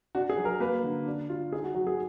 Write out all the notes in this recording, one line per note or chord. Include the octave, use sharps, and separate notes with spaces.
D4 F#4
G#4
F#3
A#4
A#3 B4
D3
D4
F4
D#4 G#4
F#4
F#3 F#4
G#4